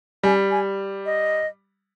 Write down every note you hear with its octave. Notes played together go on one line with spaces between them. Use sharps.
G3 G#5
G#5
D#5